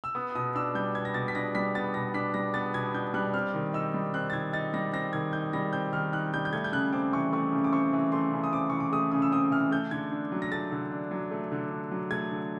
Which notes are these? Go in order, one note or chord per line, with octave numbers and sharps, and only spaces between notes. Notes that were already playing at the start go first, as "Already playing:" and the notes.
E6
B3 D#6
B2 D#6
D4 E6
G3 G6
B3 G#6
A#6
B2 A6
B6
D4 A#6
G3 B6
B3 A6
B2 A#6
D4 B6
G3 A#6
B3 A6
B2 G#6
D4 G6
G3 F#6
C4 F6
D#3
D#4 E6
G3
C4 F#6
A6
D#3 G#6
D#4 A6
G3 A#6
C4 A#6
D#3 G#6
D#4 G6
G3 A#6
C4 G6
D#3 F6
D#4 F#6
G3 G6
G6
A3 G#6
G6
C#3 F#6
C4 D6
E3 C#6
A3 C#6
C#3
D6
C4 C#6
E3
A3 C6
C#3
D#6
C4 D6
E3 C#6
D6
A3 D#6
C#3 D#6
E6
C4 D#6
E3 F6
A3 G6
D3 G#6
D4
F#3
A#6
A3 A6
D3
D4
F#3
A3
D3
D4
F#3
A3 G#6
D3